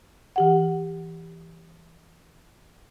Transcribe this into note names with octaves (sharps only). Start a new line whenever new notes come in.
E3 G4 F#5